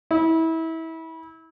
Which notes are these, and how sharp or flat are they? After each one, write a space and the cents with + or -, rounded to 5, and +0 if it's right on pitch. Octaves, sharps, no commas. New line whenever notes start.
E4 -25